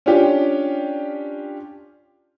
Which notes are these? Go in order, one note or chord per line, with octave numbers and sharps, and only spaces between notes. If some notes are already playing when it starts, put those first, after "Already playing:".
C#4 D4 F4 G4